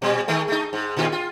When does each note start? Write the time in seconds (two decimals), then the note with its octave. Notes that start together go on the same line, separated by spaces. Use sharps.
0.02 A#2 G3
0.28 D#3 G#3 A3
0.48 A3 D#4
0.73 G#2
0.97 A#2 D#3 F4
1.12 F4